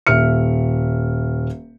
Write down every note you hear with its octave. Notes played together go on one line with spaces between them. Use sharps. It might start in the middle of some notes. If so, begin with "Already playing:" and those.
D#1 E5 F6 C#7